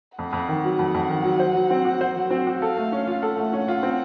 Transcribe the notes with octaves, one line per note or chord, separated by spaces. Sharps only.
F2 F#5
F2
D#3
F#3
F2
F2
D#3
F#3
C5
F#3
C4
F#4
C5
F#3
C4
F#4
A4 F5
A3
C#4
F4
A4 F#5
A3
C#4
F4
C4